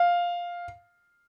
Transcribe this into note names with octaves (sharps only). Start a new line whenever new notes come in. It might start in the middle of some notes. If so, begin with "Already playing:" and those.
Already playing: F5